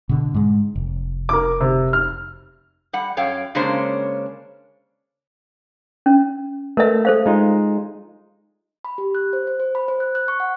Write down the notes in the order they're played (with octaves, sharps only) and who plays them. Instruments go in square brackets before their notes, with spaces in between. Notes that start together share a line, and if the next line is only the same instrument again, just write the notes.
[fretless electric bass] B2 D3
G#2 G#3
F1
[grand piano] A#4 D6
C3
F6
[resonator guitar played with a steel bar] G3 F#5
F#2 C#5 F5 G5
C#3 G#3 A#3 C#4 D4 C5
[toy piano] C#4
[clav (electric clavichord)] A3 [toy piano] A#4 B4 E5
[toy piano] A4 C5 F5
[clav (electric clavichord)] G#3 D#4 F4
[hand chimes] B5
G4
F#6
C5
C5
C5
B5
C5
F#6
F#6
C#6
F#5